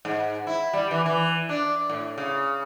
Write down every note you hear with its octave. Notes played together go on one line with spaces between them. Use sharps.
G#2
E4
G3
E3
E3
D4
A2
C#3